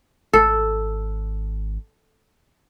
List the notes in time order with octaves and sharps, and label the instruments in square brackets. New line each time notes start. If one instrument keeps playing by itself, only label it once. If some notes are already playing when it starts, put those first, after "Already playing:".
[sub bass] G#1 [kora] A4